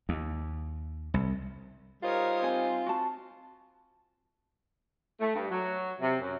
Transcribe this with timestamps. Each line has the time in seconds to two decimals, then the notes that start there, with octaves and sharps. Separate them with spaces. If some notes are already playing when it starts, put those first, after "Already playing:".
0.09 D#2
1.14 C2
2.03 G3 D#4 F4 A#4 C5 C#5 D#6
2.44 C4 G#5
2.86 F#4 A5
5.20 A3
5.35 G2
5.50 F#3
6.01 C3
6.20 F#2